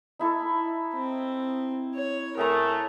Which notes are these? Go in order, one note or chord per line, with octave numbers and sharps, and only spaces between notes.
D#4 E4 A4
C4
C#5
A2 A3 G#4 A#4 G#5 A#5